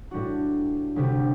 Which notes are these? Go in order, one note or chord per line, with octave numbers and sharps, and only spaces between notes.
A2 G3 D4 F#4
D2 C3 G3